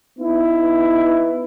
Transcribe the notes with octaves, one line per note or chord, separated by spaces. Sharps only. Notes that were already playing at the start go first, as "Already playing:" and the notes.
B3 D#4 E4